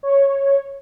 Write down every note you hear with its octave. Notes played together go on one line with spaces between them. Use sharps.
C#5